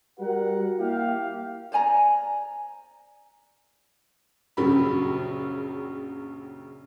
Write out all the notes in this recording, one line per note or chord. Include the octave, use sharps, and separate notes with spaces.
G3 F#4 A#4 F#5
A#3 E4 G4 F5
C5 D5 G#5 A#5
A#1 F#2 C#3 F#3 G3 B5